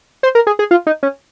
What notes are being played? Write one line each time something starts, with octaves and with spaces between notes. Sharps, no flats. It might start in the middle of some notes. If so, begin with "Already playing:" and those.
C5
A#4
G#4
G#4
F4
D#4
C#4